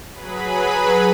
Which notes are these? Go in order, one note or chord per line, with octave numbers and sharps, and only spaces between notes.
F#3 G#4 B4 B5